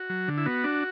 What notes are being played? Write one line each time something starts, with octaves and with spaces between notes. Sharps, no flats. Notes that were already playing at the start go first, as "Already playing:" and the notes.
Already playing: F#4
F#3
D3
E4
B3 F#4
D4